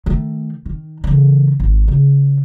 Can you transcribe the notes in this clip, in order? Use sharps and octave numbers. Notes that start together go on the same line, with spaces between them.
D#3 A3
D#3
C#3 E3
G#1
C#3